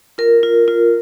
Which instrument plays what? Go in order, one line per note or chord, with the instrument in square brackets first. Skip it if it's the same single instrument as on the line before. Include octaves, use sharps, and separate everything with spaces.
[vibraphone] F4 A#4
F4
F4